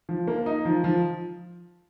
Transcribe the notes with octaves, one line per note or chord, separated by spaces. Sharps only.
F3
A#3
D#4
F3
F3